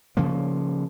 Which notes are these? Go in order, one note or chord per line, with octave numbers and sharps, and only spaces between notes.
C#3 F3 A#3